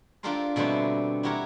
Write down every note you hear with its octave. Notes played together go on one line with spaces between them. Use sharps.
D4 F4 G4 A4 A#4 C5
B2 D3 G3 A3 C4
E4 F#4 G4 A#4 C#5